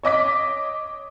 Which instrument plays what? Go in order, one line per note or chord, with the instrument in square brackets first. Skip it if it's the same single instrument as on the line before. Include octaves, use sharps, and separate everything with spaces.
[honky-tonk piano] C#5 D#5 D6 B6